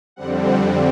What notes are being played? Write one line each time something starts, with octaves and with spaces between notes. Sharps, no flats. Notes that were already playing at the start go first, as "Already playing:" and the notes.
F2 D3 G3 C4 F#5
F#5